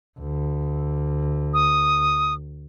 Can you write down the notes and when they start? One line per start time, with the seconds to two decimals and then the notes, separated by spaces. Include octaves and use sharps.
0.20 D2
1.54 D#6